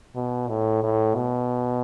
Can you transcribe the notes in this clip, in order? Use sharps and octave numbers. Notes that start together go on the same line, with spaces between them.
B2
A2
A2
B2